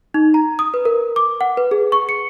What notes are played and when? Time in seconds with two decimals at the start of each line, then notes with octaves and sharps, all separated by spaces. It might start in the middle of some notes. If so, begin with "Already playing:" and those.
0.14 D#4
0.34 A#5
0.59 D#6
0.74 B4
0.85 A#4
1.16 D6
1.41 F#5
1.57 B4
1.71 G#4
1.92 C#6
2.09 C#7